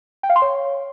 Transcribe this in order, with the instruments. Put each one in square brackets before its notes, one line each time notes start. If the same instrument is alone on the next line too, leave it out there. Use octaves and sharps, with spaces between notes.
[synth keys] G5
F5
C6
C#5